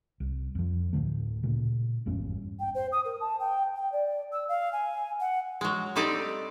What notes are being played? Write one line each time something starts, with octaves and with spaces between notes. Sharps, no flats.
C2
F2 F3
D2 A2 D3 A3
A#2 C#3
G#1 E2 G2 C#4
G5
C5
D#6
A#4
A5
G5
G5
D5
E6
F5
G#5
F#5
F#3 G#3
G3 A3 C4 D#4 G4 D5